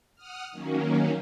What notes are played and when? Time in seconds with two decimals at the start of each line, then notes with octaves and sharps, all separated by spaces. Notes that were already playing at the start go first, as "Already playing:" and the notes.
0.16 F#5 D#6 F6
0.52 D#3 F#3 A#3 C#4